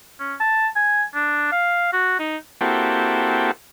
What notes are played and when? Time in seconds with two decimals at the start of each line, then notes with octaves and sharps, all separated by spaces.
0.20 C#4
0.40 A5
0.76 G#5
1.14 D4
1.52 F5
1.92 F#4
2.19 D#4
2.61 A#3 C4 E4 F#4 G4 A4